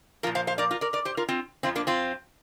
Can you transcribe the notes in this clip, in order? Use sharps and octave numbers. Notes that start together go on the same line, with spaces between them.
A#2 F3 F4 A#4
C5 F5
C5 F5
A#4 D5
F4 A#4
A#4 D5
A#4 D5
G4 C5
F4 A#4
C4 F4
F2 F3 C4 F4
A#3 D4
C4 F4